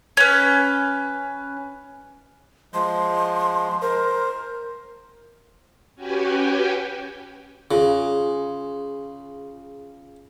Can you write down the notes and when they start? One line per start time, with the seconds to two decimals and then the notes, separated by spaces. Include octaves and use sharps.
0.17 C#4 B4
2.74 F3 G#3 C6
3.82 A#4 C5
5.96 C#4 F#4 G4 B4 G5 G#5
7.71 C#3 F4 G#4